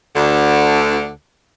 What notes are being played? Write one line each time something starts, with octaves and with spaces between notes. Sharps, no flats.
D2 D3